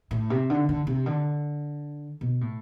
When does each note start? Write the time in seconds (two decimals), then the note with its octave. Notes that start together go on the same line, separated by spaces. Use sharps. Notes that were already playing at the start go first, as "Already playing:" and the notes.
0.11 A2
0.30 C3
0.50 D3
0.69 D3
0.87 C3
1.06 D3
2.21 B2
2.41 A2